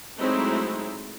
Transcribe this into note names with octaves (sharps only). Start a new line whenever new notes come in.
F#3 G#3 A3 C4 D#4 E4